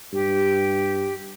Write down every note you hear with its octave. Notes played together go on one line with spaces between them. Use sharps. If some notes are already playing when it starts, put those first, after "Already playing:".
G2 G4